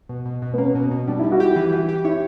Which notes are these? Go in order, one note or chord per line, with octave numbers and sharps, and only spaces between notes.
B2
B2
B2
B3
A#3 C#4
B2
B2
G3 D4
E4
G3
F#4
E4 G4
E3
E3
G4
E4 C#5